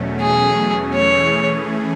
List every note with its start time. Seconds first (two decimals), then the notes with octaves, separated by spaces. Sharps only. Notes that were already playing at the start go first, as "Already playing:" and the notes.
Already playing: E2 B2 F#3 A3 C#4
0.21 G#4
0.94 E3 A3 C#4 G#4 C#5